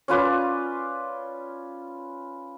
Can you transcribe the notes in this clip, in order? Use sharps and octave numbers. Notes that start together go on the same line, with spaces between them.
C#4 F4 B4 D5